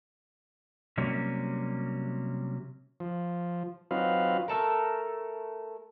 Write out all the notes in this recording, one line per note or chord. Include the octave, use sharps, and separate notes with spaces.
C3 F#3 G3 A#3 C#4
F3
F#3 C4 D#4 F4 B4 F5
A3 A4 A#4